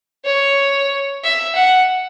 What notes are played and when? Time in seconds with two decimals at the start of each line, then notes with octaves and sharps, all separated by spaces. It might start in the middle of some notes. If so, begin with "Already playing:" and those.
0.25 C#5
1.23 E5
1.56 F#5